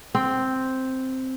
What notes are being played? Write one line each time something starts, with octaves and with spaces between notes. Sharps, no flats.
C4